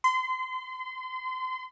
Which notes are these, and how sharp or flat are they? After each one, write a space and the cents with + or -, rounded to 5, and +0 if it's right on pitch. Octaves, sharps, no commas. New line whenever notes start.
C6 -30